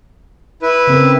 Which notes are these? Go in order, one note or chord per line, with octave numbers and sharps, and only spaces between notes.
E4 B4
C#3 C4 A#4